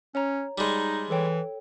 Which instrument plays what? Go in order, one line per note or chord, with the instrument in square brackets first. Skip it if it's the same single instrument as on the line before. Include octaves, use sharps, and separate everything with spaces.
[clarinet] C#4 [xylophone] C#5 A#5
[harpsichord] G3 G#3 [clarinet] D#4
[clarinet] E3 [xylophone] A4 C#5 G5